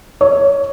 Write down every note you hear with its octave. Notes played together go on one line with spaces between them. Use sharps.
C#5